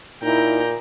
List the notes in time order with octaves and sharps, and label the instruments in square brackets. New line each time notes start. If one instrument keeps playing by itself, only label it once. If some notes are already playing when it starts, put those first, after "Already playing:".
[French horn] A#2 [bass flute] D#4 [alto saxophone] E4 [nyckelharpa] G5 A#5